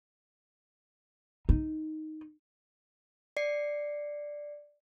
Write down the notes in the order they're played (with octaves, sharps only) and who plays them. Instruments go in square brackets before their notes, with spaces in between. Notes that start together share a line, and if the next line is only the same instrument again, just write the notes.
[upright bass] D#4
[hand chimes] D5 C7 C#7